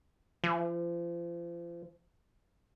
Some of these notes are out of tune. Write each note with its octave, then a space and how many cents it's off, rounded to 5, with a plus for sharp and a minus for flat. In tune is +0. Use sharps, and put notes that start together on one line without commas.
F3 -35